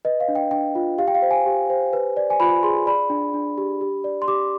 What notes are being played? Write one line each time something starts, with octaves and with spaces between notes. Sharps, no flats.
B4 D#5
F5
D4
G5
D4 G5
F4
G4 F5
G5
F5
C5
G#5
G4
C5
B4
D5
G#5
F4 B5
G#4 C6
D5 B5
D4
D4
G4
G4
D5
C6
G4 D6